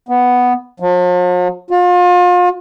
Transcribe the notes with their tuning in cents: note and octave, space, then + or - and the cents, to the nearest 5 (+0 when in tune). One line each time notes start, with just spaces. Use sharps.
B3 +0
F3 +45
F4 +35